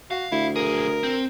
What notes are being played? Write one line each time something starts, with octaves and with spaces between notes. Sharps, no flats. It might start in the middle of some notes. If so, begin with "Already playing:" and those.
F#4 F5
D2 E4
B1 G#4 A#4
C4